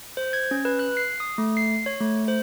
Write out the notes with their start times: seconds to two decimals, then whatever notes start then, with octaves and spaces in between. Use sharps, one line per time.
0.17 C5
0.33 G#6
0.51 C#4
0.65 B4
0.79 F#6
0.97 C7
1.20 D#6
1.38 A3
1.57 C7
1.86 C#5
2.00 A3
2.28 C5